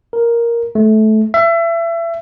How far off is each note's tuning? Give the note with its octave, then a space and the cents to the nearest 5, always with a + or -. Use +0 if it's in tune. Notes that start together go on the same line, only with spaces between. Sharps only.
A#4 +5
A3 -20
E5 +30